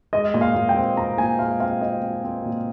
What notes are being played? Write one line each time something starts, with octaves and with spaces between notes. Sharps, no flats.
G#3 D#5
A#2
F5
A#2
G5
C4
C4 A#5
A#2 G#5
G#3 F5
C4 F5
C4 D#5
C4
C4
A#2